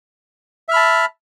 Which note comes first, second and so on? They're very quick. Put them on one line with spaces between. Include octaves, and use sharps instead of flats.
E5 F6 B5 A5